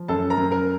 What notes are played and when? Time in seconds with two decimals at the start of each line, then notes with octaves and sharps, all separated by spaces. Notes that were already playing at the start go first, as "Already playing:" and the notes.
Already playing: F3
0.08 F#2 A4 A5
0.30 A#4 A#5
0.38 F#2
0.51 A#4 A#5